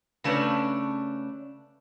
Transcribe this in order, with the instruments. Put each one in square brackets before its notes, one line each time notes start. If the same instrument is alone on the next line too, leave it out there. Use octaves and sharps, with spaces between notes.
[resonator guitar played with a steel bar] C#3 A3 C#4 D4 B4